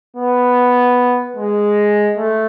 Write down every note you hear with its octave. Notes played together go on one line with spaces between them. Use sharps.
B3
G#3
A3